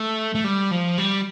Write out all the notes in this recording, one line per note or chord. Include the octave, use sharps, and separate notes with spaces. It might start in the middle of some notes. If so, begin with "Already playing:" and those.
Already playing: A3
A3
G3
F3
G3